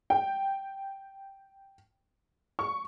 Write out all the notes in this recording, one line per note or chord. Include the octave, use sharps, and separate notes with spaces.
G5
C#6